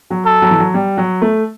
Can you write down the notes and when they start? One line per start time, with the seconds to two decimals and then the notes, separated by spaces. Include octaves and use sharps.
0.10 F#3
0.26 A4
0.42 F#3
0.50 E3
0.59 F#3
0.74 G3
0.97 F#3
1.22 A3